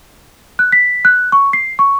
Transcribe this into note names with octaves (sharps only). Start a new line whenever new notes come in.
F#6
B6
F#6
C#6
C7
C#6